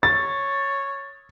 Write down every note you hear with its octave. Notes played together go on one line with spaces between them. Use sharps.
C#5 A6